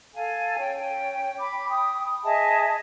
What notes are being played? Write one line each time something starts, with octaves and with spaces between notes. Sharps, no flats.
A4 F5 G#5
C#4 G5
B5 D6
G5 D#6
G#4 D#5 E5 A5